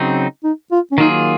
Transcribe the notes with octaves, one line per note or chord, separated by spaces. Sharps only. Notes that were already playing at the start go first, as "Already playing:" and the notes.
Already playing: C#3 F#3 C4 D#4
D#4
F4
C#4
D#3 F#3 A#3 D#4 F4 G#4